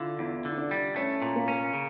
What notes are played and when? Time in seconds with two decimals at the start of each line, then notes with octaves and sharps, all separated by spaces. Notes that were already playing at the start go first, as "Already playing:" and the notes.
Already playing: D3 D4 E4 F4
0.19 E2 E4
0.45 D3
0.51 E4
0.58 D4
0.71 G3
0.96 A3 C#4
1.22 A#2
1.36 A#3
1.48 C#4
1.73 C#3